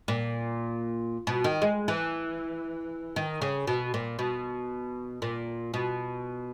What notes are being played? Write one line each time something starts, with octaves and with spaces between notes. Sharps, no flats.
A#2
B2
D#3
G#3
E3
D#3
C#3
B2
A#2
B2
A#2
B2